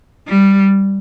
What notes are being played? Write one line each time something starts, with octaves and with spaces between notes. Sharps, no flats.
G3